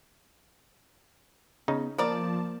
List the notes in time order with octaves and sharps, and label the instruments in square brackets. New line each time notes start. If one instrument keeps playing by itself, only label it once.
[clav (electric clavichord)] C#3 D#4 [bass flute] B3
[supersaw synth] F3 A5 [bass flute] A#3 [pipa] A#4 D5